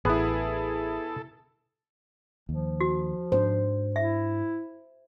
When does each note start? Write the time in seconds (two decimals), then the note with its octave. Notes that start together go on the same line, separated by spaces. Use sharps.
0.05 A1 B3 E4 G#4 A4
2.49 D#2 F3
2.81 F#4
3.32 G#2 C#4 D4 C5
3.96 E4 E5